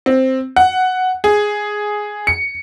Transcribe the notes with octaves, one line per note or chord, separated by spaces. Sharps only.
C4
F#5
G#4
C#7